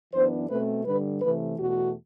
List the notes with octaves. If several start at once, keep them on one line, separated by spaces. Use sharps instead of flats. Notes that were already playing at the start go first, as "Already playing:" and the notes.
F#2 E3 B3 D4 C5
B2 A3 C4 B4
G2 D3 G3 B4
C3 E3 A3 B4
E2 B2 A3 F#4